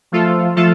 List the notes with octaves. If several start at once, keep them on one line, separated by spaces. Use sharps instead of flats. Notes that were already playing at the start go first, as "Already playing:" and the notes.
F3 A3 F4 A4
F3 A3 F4 A4